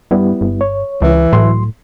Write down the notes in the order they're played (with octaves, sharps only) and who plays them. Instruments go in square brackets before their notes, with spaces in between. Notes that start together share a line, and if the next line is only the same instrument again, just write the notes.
[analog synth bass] G2 [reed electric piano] G3 B3 E4
[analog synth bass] G1
[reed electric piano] C#5
[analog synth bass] C#2 [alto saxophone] E3
[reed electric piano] C#2 F#3 C6 [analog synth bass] A2